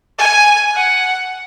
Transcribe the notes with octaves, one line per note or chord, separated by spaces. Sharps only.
G#5
F#5